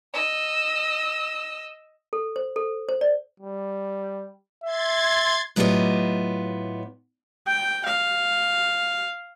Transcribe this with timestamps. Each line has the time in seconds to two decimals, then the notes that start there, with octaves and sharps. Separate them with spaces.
0.14 D#5 E6
2.13 A4
2.36 C5
2.56 A4
2.89 C5
3.01 D5
3.40 G3
4.64 E5 C6 G#6 A6
5.56 A2 F#3 B3 F4 G4 D#5
7.47 G5
7.86 F5